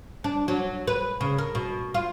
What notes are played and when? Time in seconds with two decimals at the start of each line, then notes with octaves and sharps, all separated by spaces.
0.24 D4
0.48 F#3
0.87 B4
1.21 C#3
1.38 A#4
1.55 B2
1.94 F4